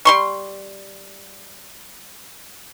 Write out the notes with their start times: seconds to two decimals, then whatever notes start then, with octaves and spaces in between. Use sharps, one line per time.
0.05 G3 C6 C#6